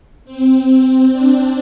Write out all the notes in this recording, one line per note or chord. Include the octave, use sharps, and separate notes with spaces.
C4
C4
D4